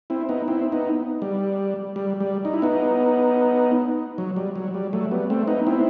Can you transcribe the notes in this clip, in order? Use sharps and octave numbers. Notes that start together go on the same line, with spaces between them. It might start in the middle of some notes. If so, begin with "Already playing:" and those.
C4 E4
B3 D#4
C4 E4
B3 D#4
G3
G3
G3
D#4
E4
B3 D#4
F#3
G3
F#3
G3
F#3 A3
G3 B3
A3 C4
B3 D#4
C4 E4